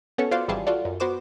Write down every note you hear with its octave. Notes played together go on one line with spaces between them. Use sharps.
B3 C#4 F#4 A4 C#5
F4 F#4 C5 D5 F5
G#1 E3 G3 F4 G#4 A5
F4 F#4 A4 D5
F#2
B3 F#4 C5 D6 E7